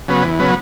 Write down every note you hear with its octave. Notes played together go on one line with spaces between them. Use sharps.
C#3 F#3 B3
E2
C#3 F#3 B3